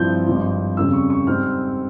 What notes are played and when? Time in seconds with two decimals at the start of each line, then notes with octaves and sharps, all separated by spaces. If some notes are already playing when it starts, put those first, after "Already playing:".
Already playing: G2 F3 C4 E4 G6
0.27 G#1 G2 F3
0.77 F2 C#3 G3 E6
0.93 C#6
1.10 C#6
1.27 G#2 G3 C4 F6